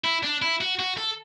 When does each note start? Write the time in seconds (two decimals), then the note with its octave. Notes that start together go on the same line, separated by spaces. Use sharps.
0.04 E4
0.23 D4
0.42 E4
0.61 F#4
0.79 F#4
0.97 A4